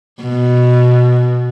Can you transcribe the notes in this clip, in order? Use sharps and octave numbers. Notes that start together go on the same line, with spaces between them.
B2